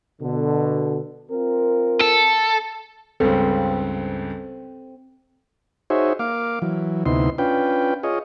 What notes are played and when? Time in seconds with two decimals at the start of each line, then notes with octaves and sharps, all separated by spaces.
0.21 B2 D3
1.31 C4 F4 A#4
2.01 A4
3.20 C#2 G2 C#3 C4 A4
5.90 D#4 F#4 G#4 C5 C#5 E5
6.19 A#3 F5 D6
6.62 E3 F#3
7.06 D2 C3 B3 D#4 E4 C6
7.38 C#4 D4 F4 B4 G5
8.03 F4 G#4 C#5 D#5